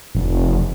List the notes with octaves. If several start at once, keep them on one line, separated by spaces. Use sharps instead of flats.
F1